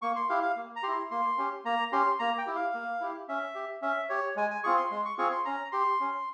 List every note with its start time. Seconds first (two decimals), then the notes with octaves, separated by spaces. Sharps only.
0.02 A#3 C#6
0.16 C6
0.29 E4 G4 F5
0.42 F5
0.56 A#3
0.76 A#5
0.83 E4 G4 C6
1.11 A#3 C6
1.38 C#4 G4
1.65 A#3 A#5
1.92 C#4 G4 C6
2.19 A#3 A#5
2.38 G5
2.46 E4 G4
2.56 F5
2.74 A#3
3.01 E4 G4
3.28 C#4 E5
3.55 G4
3.82 C#4 E5
4.09 G4 C#5
4.36 G#3 G#5
4.51 G#5
4.64 C4 F4 G#4 C#6
4.77 C6
4.91 G#3 C6
5.05 C#6
5.18 C4 F4 G#4 C#6
5.32 C6
5.45 C#4 A#5
5.72 G4 C6
6.00 C#4